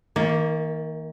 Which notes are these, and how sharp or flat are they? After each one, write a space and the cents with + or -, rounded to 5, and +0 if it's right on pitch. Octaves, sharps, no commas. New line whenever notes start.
D#3 +40 A#3 +0